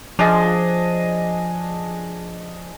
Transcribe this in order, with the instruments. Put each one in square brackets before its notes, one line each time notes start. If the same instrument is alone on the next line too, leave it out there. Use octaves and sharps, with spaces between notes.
[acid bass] F3 [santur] D4 G#4 D#5